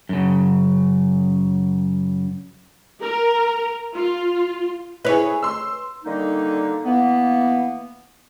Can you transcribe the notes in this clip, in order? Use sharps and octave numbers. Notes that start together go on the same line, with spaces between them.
F#2 C#3
A#4
F4
E4 G#4 B4 C#5
C6 E6
D3 D#3 G3 A#3 D#4
E3 A#3 B3